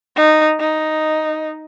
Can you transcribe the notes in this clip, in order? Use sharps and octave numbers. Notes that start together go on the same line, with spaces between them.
D#4
D#4